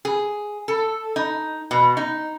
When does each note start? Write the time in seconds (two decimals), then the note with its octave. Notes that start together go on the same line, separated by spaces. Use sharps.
0.05 G#4
0.68 A4
1.16 D#4
1.71 B2
1.97 D#4